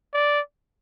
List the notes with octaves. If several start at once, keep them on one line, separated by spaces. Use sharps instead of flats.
D5